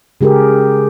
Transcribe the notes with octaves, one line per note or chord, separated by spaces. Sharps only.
C#3 G#3 G4 G#4 A#4